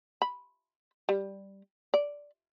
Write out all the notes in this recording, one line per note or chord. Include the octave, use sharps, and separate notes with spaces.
B5
G3
D5